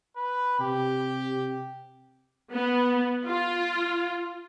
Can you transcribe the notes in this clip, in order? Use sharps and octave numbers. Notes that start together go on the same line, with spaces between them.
B4
C3 G4
B3
F4